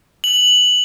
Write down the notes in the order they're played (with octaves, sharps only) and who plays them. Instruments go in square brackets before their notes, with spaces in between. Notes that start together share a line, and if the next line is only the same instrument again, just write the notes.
[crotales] F#7